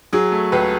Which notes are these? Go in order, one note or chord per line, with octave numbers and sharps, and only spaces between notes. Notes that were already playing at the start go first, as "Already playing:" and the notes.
F#3 G#4
A3
C#2 B4